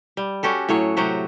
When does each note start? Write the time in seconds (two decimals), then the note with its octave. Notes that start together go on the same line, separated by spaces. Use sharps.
0.17 G3
0.43 C#4 F#4 G4 A4
0.69 A2 F#3 C#5
0.97 C3 F#3 F#4 G4